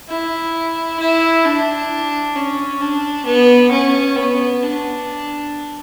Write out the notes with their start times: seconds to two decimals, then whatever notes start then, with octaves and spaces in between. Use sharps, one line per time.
0.09 E4
0.99 E4
1.44 D4
2.35 C#4
2.81 D4
3.25 B3
3.71 C#4
4.16 B3
4.62 D4